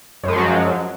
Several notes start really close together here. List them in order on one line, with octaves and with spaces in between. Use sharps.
F#2 G#3 F3 F#3